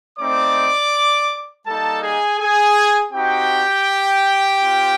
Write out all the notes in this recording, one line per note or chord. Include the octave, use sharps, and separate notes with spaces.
A3 C4 D#4 D5 D6
G3 A#3 D#4 A4 A5
G#4 G#5
G#4 G#5
C4 D#4 F#4 G4 G5
C4 F4